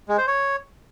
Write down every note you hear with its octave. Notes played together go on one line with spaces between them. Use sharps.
G#3
C5
C#5